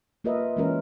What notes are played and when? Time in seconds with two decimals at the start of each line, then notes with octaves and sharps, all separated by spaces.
0.24 A#3 F4 A#4 B4 D#5 E5
0.57 E3 G#3 A#3 C#4 F4 A#4